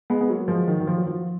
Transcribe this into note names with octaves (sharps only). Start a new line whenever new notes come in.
G#3 B3
B3
F#3 A#3
F3 G#3
D#3 F#3
D#3
F3
F#3
F3